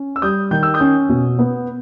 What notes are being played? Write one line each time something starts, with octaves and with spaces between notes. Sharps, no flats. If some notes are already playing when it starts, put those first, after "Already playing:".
Already playing: C#4
E6
G3 D#6 G6
D#3 G6
E6
D#6 G6
C#4
B2
B3